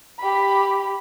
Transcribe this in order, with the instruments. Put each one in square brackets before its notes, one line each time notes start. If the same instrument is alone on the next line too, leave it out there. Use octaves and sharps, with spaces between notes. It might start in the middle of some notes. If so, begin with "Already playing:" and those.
[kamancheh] G4 B5